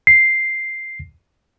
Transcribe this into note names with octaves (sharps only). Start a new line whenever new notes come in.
C7